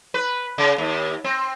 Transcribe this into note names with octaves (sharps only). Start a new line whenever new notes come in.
B4
C#3
D#2
C4